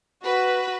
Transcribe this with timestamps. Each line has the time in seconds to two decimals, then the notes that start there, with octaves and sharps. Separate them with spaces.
0.24 F#4 B4